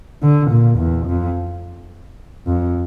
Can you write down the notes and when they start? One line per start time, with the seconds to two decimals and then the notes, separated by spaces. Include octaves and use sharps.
0.23 D3
0.51 A#2
0.79 E2
1.07 F2
2.47 F2